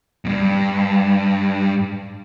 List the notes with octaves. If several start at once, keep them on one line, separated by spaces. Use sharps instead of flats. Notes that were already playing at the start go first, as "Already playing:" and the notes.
E2 G2